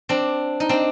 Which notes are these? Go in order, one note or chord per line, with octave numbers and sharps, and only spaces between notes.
C4 D4
D#4
C4 D4